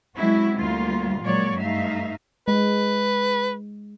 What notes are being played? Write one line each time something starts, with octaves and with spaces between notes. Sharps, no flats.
F#3 G#3 C4 C#4 E4 F#4
D2 G3 A#3 F4
A#2 F#3 G#3 A#3 C#5 D5
G2 A3 D#4 E5 F5
G#3 B4